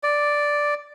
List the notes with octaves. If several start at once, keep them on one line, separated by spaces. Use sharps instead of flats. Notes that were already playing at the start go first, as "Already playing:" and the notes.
D5